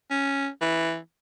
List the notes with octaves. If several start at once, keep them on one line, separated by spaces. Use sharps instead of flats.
C#4
E3